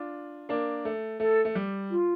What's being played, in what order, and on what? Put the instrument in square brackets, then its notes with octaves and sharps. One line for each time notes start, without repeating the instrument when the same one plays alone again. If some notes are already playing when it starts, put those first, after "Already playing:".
Already playing: [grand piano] D4 F4
A#3 D4
A3
[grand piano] A3 [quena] A4
[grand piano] A3
G3
[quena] F4